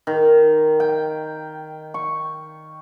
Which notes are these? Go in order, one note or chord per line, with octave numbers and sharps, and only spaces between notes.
D#3
G5
C#6